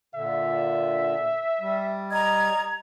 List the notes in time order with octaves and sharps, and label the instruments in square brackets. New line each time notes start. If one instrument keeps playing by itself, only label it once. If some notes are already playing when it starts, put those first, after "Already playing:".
[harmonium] A#2 D3 [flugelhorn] E5
[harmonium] G3
[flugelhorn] D#5 [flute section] A#5 G#6